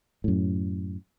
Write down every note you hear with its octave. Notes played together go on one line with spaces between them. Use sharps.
F#2 A2